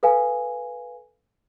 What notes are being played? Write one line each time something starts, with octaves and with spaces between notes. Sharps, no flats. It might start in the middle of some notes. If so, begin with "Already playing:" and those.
A4 B4 F5 G#5